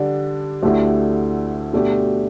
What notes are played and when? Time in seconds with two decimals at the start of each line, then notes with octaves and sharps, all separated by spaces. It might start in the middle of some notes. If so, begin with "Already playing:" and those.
Already playing: D3 G3 D4
0.63 D2 D3 A3 E4 G4
1.73 B2 A3 D4 G4